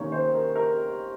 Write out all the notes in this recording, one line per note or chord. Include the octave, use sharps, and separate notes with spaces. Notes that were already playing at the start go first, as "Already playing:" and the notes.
Already playing: C3 D#3 A#3 C#4 C#5
C5
A#4
A#4